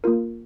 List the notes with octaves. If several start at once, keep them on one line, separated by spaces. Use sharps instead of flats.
A#3 F4 A#4